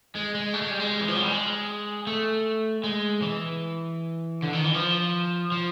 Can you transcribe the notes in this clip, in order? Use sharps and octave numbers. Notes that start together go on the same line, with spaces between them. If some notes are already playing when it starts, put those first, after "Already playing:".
G#3
G#3
A3
G#3
G3
G#3
E3
F3
F#3
G3
G#3
A3
G#3
E3
D3
D#3
E3
F3
F3